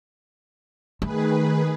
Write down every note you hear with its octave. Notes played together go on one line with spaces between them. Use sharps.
D#3 A3 G#4 B4